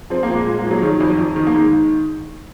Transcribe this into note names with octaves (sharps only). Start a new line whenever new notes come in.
F3 C4
A#3
A#2
G#3
A#2 G#3
A#3
F3
F#3
D#3 F#3
F2
F2
D#3
A#3
D#3 G#3